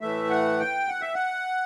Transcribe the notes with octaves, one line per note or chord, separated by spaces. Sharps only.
A2 E3 A3 E5
F#5
G5
F#5
E5
F#5